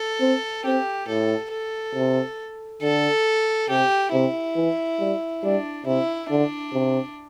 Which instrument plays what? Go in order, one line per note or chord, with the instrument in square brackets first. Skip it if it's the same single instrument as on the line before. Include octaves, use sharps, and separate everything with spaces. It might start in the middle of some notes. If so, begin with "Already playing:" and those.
Already playing: [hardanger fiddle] A4
[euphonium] C4
[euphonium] C4 [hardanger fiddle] G4
[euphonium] A2 [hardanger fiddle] A4
[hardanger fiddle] A4
[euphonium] C3
[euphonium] D3 [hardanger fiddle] A4
[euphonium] C3 [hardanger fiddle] G4
[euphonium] C3 [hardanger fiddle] E4
[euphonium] E3
G3
[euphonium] G3 [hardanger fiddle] D4
[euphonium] C3 [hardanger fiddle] E4
[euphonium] D3 [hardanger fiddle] D4
[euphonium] C3